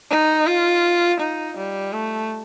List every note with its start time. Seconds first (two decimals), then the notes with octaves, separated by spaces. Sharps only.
0.10 D#4
0.47 F4
1.20 D#4
1.57 G3
1.93 A3